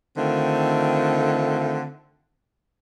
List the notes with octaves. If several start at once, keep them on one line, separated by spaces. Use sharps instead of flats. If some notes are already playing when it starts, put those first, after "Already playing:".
D3 D#3 A3 C4 F4